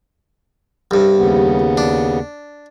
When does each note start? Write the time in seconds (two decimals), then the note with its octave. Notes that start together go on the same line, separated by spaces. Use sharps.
0.91 C2 G2
1.17 D#2 C#3 B3
1.78 D4